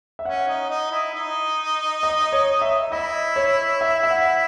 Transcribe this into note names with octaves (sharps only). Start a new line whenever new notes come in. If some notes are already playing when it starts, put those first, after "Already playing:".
E5
C#4 F#5
D#4
D#4
E4
D#4
D#5
C#5
E5
E4 D#5
C#5
E5
E5
F#5